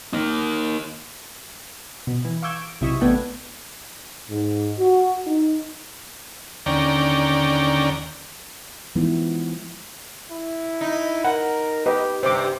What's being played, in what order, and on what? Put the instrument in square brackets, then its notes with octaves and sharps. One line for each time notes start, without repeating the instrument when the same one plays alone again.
[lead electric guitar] A#3 D#4
[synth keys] B2
E3
F5 C#6 D6 E6 G6 G#6
D7
B1 C3 E4 D#5 C#6 E6
A1 A3 B3 D4 G5 G#6
[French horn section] G#2
F#4
D#4
[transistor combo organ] D#2 D3 C#4 D5 G5 A#5
[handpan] E3 F3 G#3 B3 D#4 E4
[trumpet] E4
[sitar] D#4
[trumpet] A#4 [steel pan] F#5
[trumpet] G4 [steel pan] B4 D#5
[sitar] G2 C3 [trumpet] G4 [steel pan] C5 D6